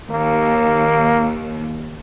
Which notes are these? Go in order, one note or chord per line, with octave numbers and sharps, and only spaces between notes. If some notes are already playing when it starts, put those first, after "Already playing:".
D#2 A#3